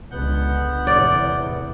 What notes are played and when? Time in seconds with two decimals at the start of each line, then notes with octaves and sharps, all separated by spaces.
0.11 C#2 D3 B3 F#5 G6
0.87 E2 A2 C3 D5